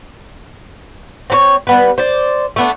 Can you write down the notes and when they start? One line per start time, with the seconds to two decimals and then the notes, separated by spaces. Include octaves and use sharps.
1.30 C4 D4 C#5
1.67 G3 B3 B4
1.98 C5 D5
2.56 A3 B3 D4